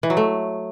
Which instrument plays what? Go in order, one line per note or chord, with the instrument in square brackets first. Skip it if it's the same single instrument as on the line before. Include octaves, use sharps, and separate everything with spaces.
[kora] E3
F#3
A3